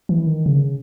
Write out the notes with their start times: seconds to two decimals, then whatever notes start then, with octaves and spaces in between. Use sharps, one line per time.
0.09 E3
0.27 D#3
0.46 C#3